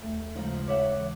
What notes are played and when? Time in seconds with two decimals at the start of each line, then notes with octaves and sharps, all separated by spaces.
0.02 D#2 A3
0.35 C#3 F3 G#3 D#4
0.68 C#5 E5 F#5 D6
0.97 E3